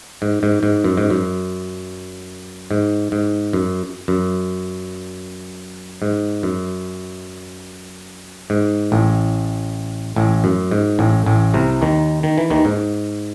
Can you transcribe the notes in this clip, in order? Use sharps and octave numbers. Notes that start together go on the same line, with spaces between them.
G#2
G#2
G#2
F#2
G#2
F#2
G#2
G#2
F#2
F#2
G#2
F#2
G#2
A1 A2
A1 A2
F#2
G#2
A1 A2
A1 A2
C2 C3
D#2 D#3
D#3
E3
D#2 D#3
G#2